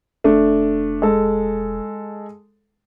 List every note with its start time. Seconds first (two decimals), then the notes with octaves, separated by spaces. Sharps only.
0.24 E1 A3 D4
1.02 G#3 A4